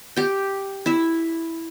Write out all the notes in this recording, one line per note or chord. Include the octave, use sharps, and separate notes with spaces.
G4 G5
E4 E5